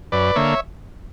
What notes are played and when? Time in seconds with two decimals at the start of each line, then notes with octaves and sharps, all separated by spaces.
0.12 F#2 B4 D5
0.36 D3 A#3 C#5 E5